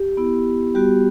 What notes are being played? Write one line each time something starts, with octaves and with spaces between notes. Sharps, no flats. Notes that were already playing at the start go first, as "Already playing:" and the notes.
Already playing: G4
B3 E4
G3 B3 F#4 G4